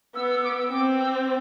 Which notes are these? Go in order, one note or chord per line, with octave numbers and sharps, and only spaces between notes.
B3 E6
E6
D6
E6
C4 D6
E6